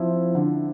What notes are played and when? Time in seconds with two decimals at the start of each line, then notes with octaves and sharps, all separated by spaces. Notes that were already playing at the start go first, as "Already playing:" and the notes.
Already playing: F3 C4 E4
0.35 D3